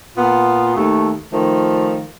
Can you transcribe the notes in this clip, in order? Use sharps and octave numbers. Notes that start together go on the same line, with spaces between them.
A#2 B3 F4
D#2 A3
D#3 F3 A3